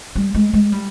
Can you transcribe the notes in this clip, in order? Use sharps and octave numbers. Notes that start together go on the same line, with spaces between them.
G3
G#3
G#3
G3